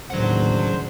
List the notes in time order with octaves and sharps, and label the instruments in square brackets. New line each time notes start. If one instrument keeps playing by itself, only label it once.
[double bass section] D#2 A2 E3 [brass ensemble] C#3 D4 C5 [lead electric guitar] F#3 F#5